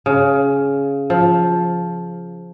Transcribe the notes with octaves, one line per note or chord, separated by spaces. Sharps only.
C#3
F3